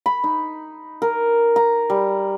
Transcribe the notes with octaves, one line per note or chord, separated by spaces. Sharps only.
B5
D#4
A#4
A#5
G3